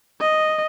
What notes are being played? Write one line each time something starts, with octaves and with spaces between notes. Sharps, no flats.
D#5